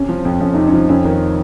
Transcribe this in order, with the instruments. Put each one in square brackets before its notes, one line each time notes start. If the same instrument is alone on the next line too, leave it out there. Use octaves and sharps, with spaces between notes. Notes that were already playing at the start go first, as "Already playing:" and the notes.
Already playing: [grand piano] C3 [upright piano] C#4
[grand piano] F3
F2
[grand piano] F2 [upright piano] C#4
[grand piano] C3 [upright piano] D#4
[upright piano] C#4
[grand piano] F3
[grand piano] F2 [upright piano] C#4
[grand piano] D#3